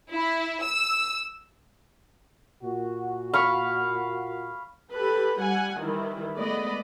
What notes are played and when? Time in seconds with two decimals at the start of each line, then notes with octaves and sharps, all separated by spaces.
0.11 E4
0.62 E6
2.63 A#2 F#4
3.34 F5 B5 C#6
4.91 G4 A4 B4
5.41 G3 F#5 G#5
5.79 D#3 E3 G3 E4
6.35 G#3 A3 B3 D5 D#5 B5